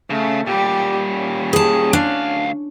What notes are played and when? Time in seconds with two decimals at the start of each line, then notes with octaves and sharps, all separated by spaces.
0.10 C#3 A3
0.47 A#2 G3 G4
1.09 C#4
1.53 G#4 A5
1.93 D2 D4 F5